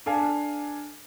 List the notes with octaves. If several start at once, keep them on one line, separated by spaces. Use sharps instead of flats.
D4 A4 F5 G#5